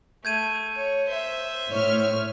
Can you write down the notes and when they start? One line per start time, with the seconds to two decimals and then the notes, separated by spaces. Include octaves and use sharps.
0.25 A3 G6 G#6 D#7
0.75 C#5
1.08 C5 E5
1.69 A2 C#5 F6